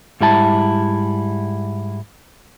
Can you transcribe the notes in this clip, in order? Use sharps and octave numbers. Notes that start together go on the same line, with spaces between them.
G#2 G3 E4 A5